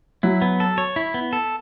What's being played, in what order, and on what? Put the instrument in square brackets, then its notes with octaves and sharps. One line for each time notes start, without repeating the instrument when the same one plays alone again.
[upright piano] F#3 [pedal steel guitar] E4
[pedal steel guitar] B3
A4
C#5
E4
B3
A4